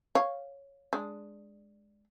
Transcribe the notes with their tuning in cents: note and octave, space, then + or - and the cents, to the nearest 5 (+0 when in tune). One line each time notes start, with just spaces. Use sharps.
C#5 +0 F5 +0
G#3 +0 D4 +0